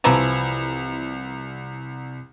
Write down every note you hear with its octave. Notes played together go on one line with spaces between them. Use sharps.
C2 E3 F3 E4 A#5